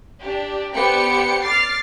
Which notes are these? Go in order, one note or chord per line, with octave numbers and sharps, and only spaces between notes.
D4 G4
B3 D4 G4 C5 G5 C#7
D6 F6 A6 C7